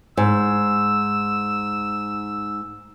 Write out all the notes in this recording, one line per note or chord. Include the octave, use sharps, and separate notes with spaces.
G#2 E6